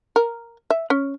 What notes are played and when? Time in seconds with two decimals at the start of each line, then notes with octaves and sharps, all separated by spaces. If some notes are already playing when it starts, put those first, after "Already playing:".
0.16 A#4
0.70 E5
0.90 C#4